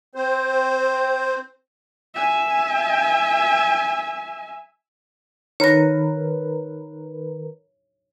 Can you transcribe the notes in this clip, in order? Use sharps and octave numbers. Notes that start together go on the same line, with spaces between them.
C4 C5
E5 G#5
D#3 A#4 B4 C#5 A#6